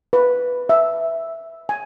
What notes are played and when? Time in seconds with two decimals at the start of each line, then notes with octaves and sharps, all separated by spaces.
0.13 B4
0.69 E5
1.69 G#5